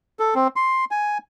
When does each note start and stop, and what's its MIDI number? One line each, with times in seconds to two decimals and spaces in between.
0.19 0.34 69
0.35 0.48 60
0.56 0.85 84
0.91 1.18 80